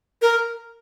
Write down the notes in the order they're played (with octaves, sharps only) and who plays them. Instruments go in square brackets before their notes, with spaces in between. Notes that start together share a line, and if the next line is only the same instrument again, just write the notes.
[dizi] A#4